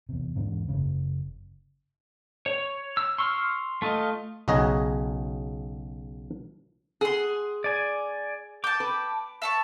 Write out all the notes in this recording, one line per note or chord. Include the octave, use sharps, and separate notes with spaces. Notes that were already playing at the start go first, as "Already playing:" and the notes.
E2 C3
E2 G#2 D3
F#1 C#3
C#5
E6
C6 C#6 E6 F6
A3 F4 D#5
B1 C#3 F#4 G#4 D#5 A#5
G#4 F#5 C6
D5 G#5
G5 A5 D6
B4
E5 A5 C#6